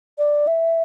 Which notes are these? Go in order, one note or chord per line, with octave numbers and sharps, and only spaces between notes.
D5
E5